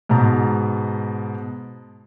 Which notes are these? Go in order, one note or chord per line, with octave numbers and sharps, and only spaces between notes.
G#2 B2 A5 A#5